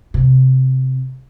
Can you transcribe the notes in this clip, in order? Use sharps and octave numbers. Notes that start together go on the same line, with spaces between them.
C3